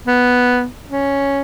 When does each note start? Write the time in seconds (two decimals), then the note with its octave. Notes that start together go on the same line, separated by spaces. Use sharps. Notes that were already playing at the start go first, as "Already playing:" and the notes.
0.07 B3
0.89 C#4